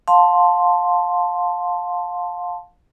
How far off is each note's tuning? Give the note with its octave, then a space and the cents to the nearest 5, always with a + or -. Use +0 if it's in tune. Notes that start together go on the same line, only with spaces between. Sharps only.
F5 +25 A5 +0 C6 +0